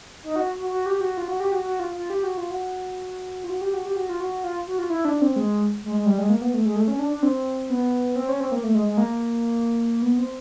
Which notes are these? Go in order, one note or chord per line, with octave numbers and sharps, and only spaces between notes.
D#4
F#4
F#4
F#4
G4
G4
F#4
F4
F#4
G4
F#4
F#4
F4
F4
G4
F#4
F4
F#4
F4
F#4
G4
F#4
G4
F#4
F4
F#4
F4
F#4
F4
E4
D4
C4
G#3
G#3
G#3
G3
G#3
A#3
B3
A3
G#3
A3
C#4
D4
D4
C4
B3
C4
C#4
C4
A#3
A3
G#3
G#3
A#3
B3
C4